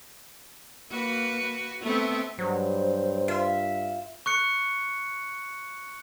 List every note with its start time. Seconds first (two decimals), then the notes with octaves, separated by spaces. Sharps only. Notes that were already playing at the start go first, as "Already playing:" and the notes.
0.90 A#3 F#4 B4
1.82 A3 B3 C4 E5 A5 C#6
2.39 G2 F#3 C5
3.28 F4 E5
4.26 C#6 F#6 C#7